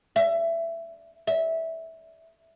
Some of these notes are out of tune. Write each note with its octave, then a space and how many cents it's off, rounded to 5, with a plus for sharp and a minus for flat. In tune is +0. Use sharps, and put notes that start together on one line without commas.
E5 +20
E5 -15